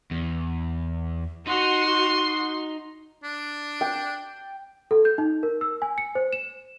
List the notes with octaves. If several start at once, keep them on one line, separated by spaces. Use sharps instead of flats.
E2
D#4 F#4 C6
D4
G5
A4
G6
D#4
A#4
E6
G#5
C#7
C5
E7